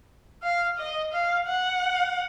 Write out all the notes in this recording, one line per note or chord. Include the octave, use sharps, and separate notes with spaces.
F5
D#5
F5
F#5